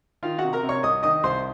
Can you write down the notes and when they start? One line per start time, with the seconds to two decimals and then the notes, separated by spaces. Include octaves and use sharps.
0.23 D#3 F4 F5
0.38 F#4 F#5
0.44 C3
0.53 A#4 A#5
0.63 C3
0.69 C#5 C#6
0.83 C2 D#5 D#6
1.03 D#3 D#5 D#6
1.23 C2 C5 C6